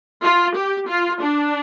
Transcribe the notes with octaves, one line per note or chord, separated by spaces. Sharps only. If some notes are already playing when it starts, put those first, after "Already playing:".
F4
G4
F4
D4